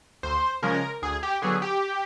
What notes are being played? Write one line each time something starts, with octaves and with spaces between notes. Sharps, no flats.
D2 C5
C#3 F3 G#3 C#4 A#4
D2 G#4
G4
D3 F#3 B3 G#4
G4